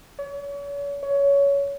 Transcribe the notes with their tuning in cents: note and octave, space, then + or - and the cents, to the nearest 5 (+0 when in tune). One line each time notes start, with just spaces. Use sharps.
C#5 +40
C#5 +20